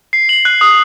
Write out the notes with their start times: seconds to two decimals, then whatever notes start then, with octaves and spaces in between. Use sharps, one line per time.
0.13 C7
0.29 F#7
0.45 F#6
0.61 D#6